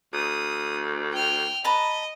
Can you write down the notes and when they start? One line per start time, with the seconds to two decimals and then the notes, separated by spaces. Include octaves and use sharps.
0.14 D2 D#6
1.12 G5 F6
1.64 B4 D#5 A5 A#5